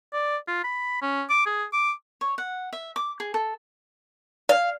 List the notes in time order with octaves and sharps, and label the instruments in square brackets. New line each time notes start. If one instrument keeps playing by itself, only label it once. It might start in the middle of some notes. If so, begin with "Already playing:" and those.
[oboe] D5
F4
B5
C#4
D6
G#4
D6
[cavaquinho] C#5
F#5
E5
D6
G#4
A4
[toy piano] D5 [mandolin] F5